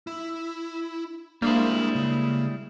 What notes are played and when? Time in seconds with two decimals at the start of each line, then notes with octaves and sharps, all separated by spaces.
0.07 E4
1.42 G3 G#3 A#3 D4 E4 C5
1.95 C#3